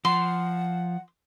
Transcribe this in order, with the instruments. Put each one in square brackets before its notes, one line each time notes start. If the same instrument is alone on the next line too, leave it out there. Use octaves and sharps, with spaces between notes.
[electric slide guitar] F3 [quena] F#5 [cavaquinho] C6